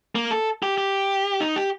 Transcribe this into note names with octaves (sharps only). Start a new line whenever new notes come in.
A#3
A4
G4
G4
D#4
G4